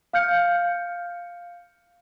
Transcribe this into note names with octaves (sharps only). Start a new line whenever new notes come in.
F5 F6 G6 C#7